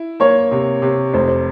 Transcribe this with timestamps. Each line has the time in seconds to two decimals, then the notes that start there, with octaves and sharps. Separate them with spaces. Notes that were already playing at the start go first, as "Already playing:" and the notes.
Already playing: E4
0.20 A#3 C#5
0.51 C3
0.82 C3
1.13 F1 C5
1.28 C5